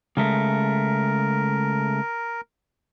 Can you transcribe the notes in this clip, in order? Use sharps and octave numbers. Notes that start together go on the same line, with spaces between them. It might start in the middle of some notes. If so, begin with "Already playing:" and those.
C#3 G#3 A3 A#4